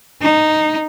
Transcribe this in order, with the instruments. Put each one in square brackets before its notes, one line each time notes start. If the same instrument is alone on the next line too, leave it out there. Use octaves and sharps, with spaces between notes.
[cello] D#4